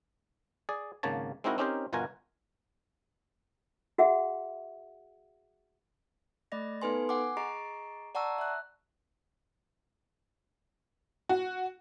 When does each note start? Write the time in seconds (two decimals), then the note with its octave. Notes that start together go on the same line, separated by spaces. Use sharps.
0.69 G#4 D5
1.03 G#1 C#3 A#3 C#5 A5
1.44 G#3 C4 D#4 E4 F#4 A#4
1.58 C4 C#4 D#4 G4 A#4 C5
1.93 G1 B2 F4 F#4 A#4 G#5
3.98 F#4 G#4 E5 F#5
6.52 A3 D5 D#5 A#6
6.82 B3 D#4 A4 B4 G#5 C6
7.09 F#5 G#5 D6
7.37 G#4 D#5 A#5 C#6 C7 D7
8.15 D5 F#5 A5 A#5 C#6 E6
8.38 E5 F#6
11.29 F#4